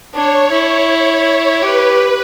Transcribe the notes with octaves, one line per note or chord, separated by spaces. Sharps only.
D4 C#5
E4
C#5
C#5
G4 B4